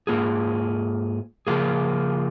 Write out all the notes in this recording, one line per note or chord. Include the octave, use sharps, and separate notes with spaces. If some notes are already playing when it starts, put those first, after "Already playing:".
G#2 D#3 A#3 F4 G#4
C#3 F3 A#3 F4 G#4